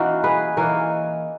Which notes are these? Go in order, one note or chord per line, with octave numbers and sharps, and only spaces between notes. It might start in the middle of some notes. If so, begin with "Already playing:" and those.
Already playing: E3 A#3 C#4 D#4 F#4 A#4
G#4 B4
E3 A#3 D#4 A#4 C#5